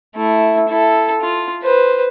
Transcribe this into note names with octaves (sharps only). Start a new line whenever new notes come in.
A3 E4
E4 A4
F4
B4 C5